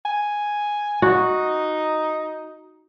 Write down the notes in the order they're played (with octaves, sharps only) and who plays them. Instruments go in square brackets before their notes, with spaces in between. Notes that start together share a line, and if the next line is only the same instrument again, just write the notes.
[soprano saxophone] G#5
[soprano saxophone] D#4 [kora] F#4